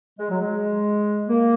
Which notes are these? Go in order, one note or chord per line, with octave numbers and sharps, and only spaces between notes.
G#3
F#3
G#3
A#3